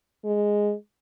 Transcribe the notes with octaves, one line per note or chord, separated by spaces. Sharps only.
G#3